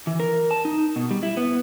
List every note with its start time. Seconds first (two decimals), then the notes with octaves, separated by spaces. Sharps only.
0.07 E3
0.20 A#4
0.51 A5
0.65 D#4
0.96 B2
1.11 G3
1.23 E4
1.37 B3